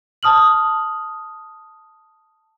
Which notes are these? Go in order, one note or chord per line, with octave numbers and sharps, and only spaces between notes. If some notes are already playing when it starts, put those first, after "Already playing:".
A5 D#6 F6 F#7